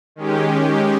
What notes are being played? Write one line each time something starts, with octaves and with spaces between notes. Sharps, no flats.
D#3 G#3 C#4 G4